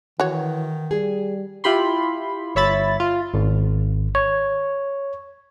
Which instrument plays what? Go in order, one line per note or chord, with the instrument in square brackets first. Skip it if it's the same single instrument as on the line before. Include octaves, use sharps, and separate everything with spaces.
[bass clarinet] D#3 [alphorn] E3 [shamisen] F#4 C#5
[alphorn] G3 [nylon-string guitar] G#4
[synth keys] E4 F4 G4 B5 C6
G1 C#5 E5 B5 A6
F4
[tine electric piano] G#1
C#5